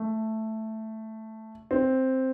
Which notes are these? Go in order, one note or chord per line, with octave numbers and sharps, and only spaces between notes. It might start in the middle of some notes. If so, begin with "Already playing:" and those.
Already playing: A3
C4